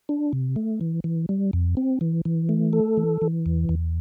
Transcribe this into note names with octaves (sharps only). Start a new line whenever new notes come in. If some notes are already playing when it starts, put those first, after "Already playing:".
D4
C3
A3
E3
E3
G3
F2
C4
E3
E3
A3
A4
E3
E3
E2
E2